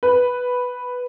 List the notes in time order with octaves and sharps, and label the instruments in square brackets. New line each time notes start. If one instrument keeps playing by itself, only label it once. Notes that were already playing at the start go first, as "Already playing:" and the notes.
[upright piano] B4